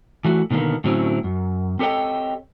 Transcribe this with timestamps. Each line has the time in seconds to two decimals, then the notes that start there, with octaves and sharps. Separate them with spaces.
0.25 E3 A3 F#4
0.51 B2 D3 D#3 A#3 B3
0.84 A2 D3 F#3 C4 C#4 E4
1.24 F#2
1.79 C4 G4 A4 C#5 D#5 G5